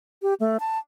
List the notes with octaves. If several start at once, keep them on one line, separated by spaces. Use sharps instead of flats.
G4
A3
A5